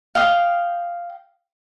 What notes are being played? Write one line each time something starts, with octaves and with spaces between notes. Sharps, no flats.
F5 G5 D#6